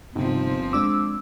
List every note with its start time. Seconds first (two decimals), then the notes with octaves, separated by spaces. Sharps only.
0.15 G1 C3 F3 C4 D#4
0.73 G#3 D4 D6 E6